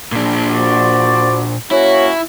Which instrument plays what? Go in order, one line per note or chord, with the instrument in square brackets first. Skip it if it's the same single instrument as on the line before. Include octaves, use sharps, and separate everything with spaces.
[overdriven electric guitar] A#2 D4
[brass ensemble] F#4 C5 D5
[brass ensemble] A#3 C#4 F#4 [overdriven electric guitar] E4 [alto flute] C#5